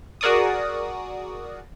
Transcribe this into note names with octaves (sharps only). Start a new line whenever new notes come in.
F#4 G#4 A#4 D5 C#6 D#6